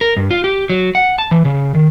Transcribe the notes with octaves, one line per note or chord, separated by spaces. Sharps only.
A#4
G2
F4
G4
F#3
F#5
A5
E3
C#3
D#3